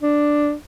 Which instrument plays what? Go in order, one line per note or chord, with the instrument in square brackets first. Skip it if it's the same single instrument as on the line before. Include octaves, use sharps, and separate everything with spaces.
[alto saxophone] D4